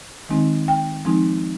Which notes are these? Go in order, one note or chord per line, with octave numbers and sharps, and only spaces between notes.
D#3 G#3 C4 D#4
G5
F3 G#3 C4 D#4